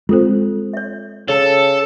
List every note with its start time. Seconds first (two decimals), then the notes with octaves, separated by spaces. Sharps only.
0.09 G#3 C4 F4 A4 C5
0.73 C#5 E5
1.28 C#3 A4